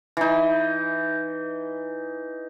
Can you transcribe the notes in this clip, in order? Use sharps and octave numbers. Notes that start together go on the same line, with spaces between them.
E3 D#4